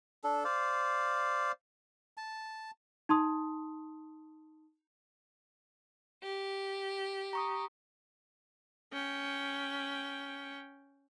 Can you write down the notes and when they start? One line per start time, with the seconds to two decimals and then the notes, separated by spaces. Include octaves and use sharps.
0.24 D4 A4
0.44 C5 D5 F5
2.17 A5
3.09 D#4 A5 C6 D#6
6.22 G4
7.33 A#5 C#6 D#6
8.93 C#4 G5